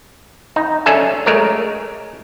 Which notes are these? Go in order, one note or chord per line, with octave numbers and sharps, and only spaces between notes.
D#4
C#4 D4 A4 E5 G#5
G#3 A3 A#4 C#5